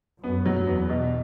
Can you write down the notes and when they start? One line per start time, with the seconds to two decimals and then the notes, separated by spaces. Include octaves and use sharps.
0.23 F#2 B3
0.46 F#3
0.67 E2 B3
0.89 B2